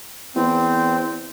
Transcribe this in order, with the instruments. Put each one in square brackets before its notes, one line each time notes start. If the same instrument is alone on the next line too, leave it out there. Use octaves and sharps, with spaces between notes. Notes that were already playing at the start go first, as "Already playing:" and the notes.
[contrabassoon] E2 [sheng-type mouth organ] C4